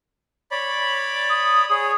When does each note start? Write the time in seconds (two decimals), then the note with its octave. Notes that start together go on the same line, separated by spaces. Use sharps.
0.51 C#5 D5 B5
1.30 D#6
1.70 G#4 C#5